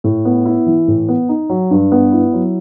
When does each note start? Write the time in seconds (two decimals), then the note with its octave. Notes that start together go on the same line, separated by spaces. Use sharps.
0.04 A2
0.25 B3
0.45 E4
0.66 E3
0.88 A2
1.08 B3
1.29 D#4
1.50 F#3
1.71 G2
1.92 B3
2.12 E4
2.33 F#3